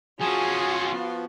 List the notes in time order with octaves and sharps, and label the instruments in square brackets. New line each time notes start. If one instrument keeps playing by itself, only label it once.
[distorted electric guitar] F3 C#4 [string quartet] F4 F#4 [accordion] G#4 G#5
[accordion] F3 B3